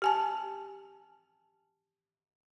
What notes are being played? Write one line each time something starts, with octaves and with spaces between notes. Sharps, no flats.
G4 G#5 A5